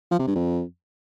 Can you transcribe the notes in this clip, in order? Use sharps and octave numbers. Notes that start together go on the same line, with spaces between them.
F3
C3
G2
F2